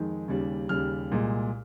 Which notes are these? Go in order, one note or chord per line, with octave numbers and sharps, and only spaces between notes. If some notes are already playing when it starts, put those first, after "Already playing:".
Already playing: F2 D#3 G#3
D#2 C#3 G3
D#2 C#3 G3 F6
C2 A#2 G#3